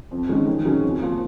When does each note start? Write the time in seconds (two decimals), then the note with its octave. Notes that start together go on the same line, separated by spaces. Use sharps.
0.11 F2
0.29 D#3 G#3 C#4
0.47 D#3
0.65 F#3 C#4 G#4
0.82 F2
1.01 F3 A#3